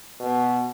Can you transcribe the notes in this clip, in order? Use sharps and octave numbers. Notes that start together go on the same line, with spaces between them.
B2